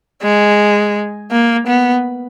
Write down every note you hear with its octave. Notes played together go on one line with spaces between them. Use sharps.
G#3
A#3
B3